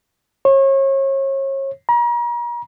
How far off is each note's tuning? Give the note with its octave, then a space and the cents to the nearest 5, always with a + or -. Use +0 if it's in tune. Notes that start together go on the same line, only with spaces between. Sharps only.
C#5 -35
A#5 +40